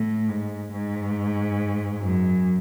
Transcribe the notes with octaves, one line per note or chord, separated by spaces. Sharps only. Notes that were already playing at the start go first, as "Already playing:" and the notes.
Already playing: A2
G#2
G#2
F#2